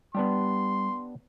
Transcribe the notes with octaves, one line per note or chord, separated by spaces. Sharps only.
G3 B3 D4 G4 C6